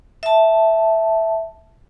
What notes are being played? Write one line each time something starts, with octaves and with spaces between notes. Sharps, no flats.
E5 A5